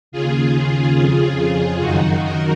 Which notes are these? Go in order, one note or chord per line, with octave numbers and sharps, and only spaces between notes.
D#2 C#3 F4 G#4
F2 C#3
F#2 D#3 D#4 F#4
F#4 A#4